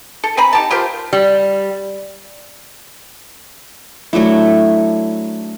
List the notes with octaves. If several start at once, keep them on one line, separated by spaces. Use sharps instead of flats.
A4
C4 G#5 A#5 B5
D#4 G4 A5
F4 G4 A#4 C5
G3
F#3 A3 D4 E4